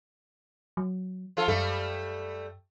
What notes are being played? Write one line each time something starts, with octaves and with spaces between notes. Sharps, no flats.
F#3
F3 F4 A4
F#2 G3 A3 A4